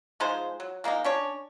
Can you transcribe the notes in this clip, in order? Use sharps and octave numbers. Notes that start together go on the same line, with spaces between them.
F3 G#3 D#4 C5
F#3
G#3 A#3 D4 D#4
C#4 D4 C#5